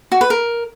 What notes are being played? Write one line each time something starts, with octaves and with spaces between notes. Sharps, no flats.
F#4
B4
A#4